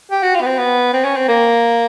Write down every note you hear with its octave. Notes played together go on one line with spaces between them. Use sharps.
G4
F#4
F4
B3
C4
B3
C4
C#4
C4
A#3